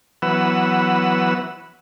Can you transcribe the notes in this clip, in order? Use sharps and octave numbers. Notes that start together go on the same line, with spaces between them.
E3 F#3 B3 B4 F#5 E6